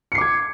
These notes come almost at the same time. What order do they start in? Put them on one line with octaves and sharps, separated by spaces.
C#7 C7 D6 G#6